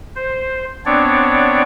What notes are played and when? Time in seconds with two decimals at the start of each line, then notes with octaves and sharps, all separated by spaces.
0.16 C5
0.86 B3 C4 D4 C#5 D5